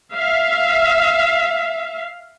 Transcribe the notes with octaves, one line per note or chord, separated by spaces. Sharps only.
E5 F5